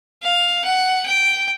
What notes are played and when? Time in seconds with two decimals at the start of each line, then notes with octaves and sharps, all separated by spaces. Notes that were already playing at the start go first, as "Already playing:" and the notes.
0.23 F5
0.65 F#5
1.06 G5